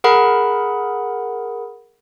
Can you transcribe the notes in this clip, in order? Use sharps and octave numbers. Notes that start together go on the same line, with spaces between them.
G#4 A#4 F#5 B5